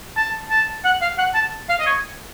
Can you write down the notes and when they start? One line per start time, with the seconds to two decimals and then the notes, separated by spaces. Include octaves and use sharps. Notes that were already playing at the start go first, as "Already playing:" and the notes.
0.17 A5
0.50 A5
0.85 F#5
1.02 F5
1.18 F#5
1.35 A5
1.69 F5
1.80 D#5
1.86 C#5